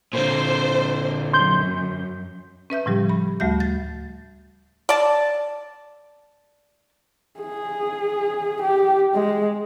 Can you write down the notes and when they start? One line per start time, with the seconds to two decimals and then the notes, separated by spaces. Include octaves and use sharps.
0.13 A#2 D3 C5
1.33 F#2 C6 G6
2.70 C#4 B4 E5 G6
2.86 A2 C#3 F3 G3 G4
3.09 B5
3.40 D2 G3 A3 F#4 E5 G6
3.60 A6
4.89 D5 A5
7.40 G#4
8.62 G4
9.14 G#3